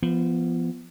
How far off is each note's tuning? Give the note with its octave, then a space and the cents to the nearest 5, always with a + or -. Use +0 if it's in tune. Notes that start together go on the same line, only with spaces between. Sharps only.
F3 -25 B3 -5